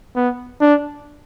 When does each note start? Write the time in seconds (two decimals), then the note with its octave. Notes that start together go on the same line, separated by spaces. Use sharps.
0.16 B3
0.61 D4